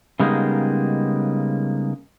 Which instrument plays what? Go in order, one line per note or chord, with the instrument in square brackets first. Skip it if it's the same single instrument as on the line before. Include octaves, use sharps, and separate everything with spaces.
[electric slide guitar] C#3 G3 G#3 A#3 B3 D#4